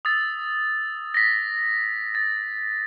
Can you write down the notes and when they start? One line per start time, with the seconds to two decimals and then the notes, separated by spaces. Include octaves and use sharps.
0.05 D#6 E6 A6
1.14 A#6 B6
2.15 A6